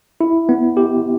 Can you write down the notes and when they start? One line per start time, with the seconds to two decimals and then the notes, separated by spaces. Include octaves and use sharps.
0.21 E4
0.49 B3
0.77 G4